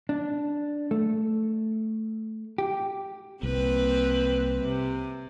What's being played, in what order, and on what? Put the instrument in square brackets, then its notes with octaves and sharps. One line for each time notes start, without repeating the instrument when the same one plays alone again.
[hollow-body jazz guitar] D4
A3
G4
[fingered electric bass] C2 [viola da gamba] A#3 C4 B4
[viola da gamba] C3